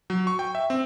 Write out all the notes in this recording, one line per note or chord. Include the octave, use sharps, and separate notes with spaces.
F#3
C#6
G5
E5
C4